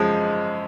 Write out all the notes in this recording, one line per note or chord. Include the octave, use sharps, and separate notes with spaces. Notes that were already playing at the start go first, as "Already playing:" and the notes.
Already playing: F#2 F3 G#3